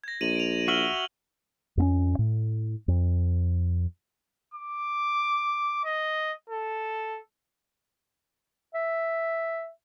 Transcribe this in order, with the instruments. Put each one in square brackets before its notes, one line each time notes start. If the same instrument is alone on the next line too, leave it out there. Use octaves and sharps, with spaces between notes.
[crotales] G#6 A#6
[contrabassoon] A#1 [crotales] D#7 F7 F#7
[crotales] D7 F7
[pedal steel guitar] F#4 E5 [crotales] F6 F#7 G7
[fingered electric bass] F2 B3 C#4
A2
F2
[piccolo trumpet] D6
D#5
A4
[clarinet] E5